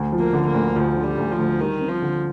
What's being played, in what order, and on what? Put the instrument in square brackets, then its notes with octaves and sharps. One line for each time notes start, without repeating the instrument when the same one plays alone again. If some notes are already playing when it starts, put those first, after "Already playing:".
Already playing: [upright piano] D2
F3
[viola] A#3
[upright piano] D3
[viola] A#3
[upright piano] D2
[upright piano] D2 [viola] F3
[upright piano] D3
[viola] G3
[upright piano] D2
[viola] F3
[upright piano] D2
[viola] D#3 [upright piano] G3
[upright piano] C4
[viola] F3
[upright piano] D3